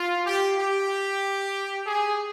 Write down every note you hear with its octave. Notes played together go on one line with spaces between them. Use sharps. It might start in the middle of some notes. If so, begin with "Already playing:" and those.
Already playing: F4
G4
G4
G#4